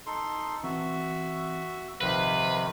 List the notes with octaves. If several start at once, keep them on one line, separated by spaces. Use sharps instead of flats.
D#4 A4 C6
E3 C4 F#4 E5
A#1 C3 D#3 F3 B4 C5 F5